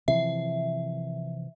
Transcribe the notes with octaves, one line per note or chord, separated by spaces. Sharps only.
C3 E3 F3 E5